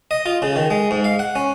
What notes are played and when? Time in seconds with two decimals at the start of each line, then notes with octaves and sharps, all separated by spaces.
0.11 D#5
0.26 F4
0.42 C#3
0.56 D#3
0.70 G#3
0.91 G#2
1.04 F5
1.19 F#5
1.36 C#4